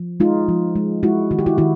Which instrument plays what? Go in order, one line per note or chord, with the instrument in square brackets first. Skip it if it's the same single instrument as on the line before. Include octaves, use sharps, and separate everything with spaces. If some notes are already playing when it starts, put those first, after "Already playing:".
Already playing: [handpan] F3
G#3 D#4 F4
F3
G#3
G#3 E4 F#4
D#3 F#4
G4
E4 F#4
D#3 E4 F#4